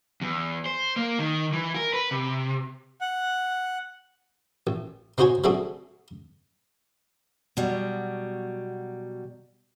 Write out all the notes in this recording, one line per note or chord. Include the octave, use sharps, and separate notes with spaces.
E2
C5
A#3
D#3
E3
A#4
B4
C3
F#5
A1
C4 D#4 F#4 C5 C#5 G#5
F#3 A3 C4 D4 F#4 G#4
B2 F#3 G3